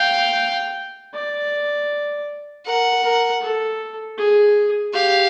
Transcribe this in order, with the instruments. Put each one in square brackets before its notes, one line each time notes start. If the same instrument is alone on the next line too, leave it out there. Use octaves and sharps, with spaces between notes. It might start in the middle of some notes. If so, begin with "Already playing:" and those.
Already playing: [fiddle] F5 [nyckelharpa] G5
[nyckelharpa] D5
[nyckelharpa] A#4 [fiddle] F#5
[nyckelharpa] A#4
A4
G#4
[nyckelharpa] G4 [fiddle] F5